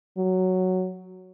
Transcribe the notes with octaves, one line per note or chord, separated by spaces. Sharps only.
F#3